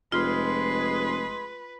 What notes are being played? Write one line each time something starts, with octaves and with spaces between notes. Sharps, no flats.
F1 G#3 F4 G#4 B4 C6